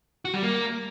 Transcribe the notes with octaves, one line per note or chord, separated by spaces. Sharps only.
F#4
G3
A#3